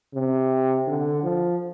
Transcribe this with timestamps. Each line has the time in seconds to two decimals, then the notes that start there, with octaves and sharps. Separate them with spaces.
0.15 C3
0.87 D3
1.24 F3